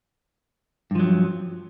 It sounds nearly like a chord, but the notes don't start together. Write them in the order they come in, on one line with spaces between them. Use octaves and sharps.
G2 F3 F#3